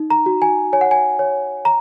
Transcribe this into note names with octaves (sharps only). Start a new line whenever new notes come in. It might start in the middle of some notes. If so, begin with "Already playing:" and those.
Already playing: D#4
A#5
F#4
G#5
C#5 G#5
F#5
G#5
C#5
A#5